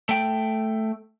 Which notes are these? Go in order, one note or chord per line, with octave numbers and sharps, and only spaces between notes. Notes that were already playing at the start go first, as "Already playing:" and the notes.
A3 G5